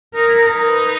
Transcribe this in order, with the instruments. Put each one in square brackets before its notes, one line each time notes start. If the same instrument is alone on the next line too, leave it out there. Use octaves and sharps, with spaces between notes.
[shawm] D#4 [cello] A#4
[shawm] E4
D#4
[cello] B4